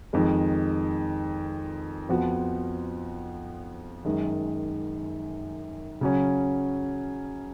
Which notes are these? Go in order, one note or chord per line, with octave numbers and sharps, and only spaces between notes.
F2 D#3 G#3
F2 F3 B3 F#4
F#2 D#3 G#3
C#3 F#3 C#4